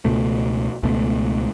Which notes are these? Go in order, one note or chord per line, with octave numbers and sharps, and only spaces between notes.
C#2 B2 A3
C#2 B2 A3